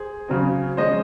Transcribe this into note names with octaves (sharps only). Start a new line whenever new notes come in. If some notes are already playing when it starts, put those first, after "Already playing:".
Already playing: G#4 C5
C#3 F#3 C4
F3 G#3 C#4 C5 D#5